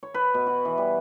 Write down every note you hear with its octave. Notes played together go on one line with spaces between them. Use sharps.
C#5
B4
B2
F#4
E3
G3